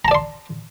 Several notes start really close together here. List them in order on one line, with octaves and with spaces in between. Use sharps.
A#5 A5 D5 C6